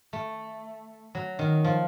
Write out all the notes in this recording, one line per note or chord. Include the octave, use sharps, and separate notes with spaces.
A3
F#3
D#3
F3